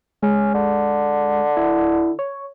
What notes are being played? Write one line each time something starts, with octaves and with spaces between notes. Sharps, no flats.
G#3 C#4
D3
E4
C#5